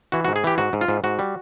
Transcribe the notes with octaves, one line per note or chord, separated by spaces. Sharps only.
E3 F#4
F#4
G#2
G#4
E3 G4
G#2 F#4
G#2
F4
G#2
G#2 F#4
G3